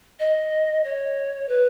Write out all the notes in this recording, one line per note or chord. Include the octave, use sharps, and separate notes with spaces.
D#5
C#5
B4